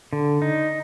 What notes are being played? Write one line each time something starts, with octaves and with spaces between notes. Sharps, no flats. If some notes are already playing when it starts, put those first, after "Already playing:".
D3
D#4